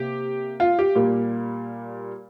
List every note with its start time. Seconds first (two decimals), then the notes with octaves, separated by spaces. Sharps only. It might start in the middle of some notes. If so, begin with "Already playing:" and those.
Already playing: C3 A#3 G4
0.60 F4
0.79 G4
0.95 A#2 G3 A#3